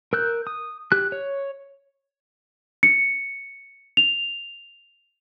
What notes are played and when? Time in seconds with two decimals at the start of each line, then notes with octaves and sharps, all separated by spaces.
0.13 A#4 E6 F#6 G6
0.47 D#6
0.92 G4 F#6
1.12 C#5
2.83 C#7
3.97 F7